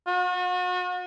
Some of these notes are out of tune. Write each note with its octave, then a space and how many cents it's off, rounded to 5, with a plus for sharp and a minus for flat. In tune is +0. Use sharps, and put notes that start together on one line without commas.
F#4 -40